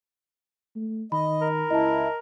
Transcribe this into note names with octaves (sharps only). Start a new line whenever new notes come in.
A3
D#3 D#5 B5
A#4
C#2 E4 D#5 A5